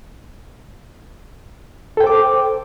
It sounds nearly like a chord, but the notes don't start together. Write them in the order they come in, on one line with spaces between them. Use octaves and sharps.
A4 G5 C5 D6